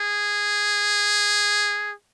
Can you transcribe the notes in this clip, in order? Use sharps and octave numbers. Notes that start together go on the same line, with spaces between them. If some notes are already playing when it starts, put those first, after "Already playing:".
Already playing: G#4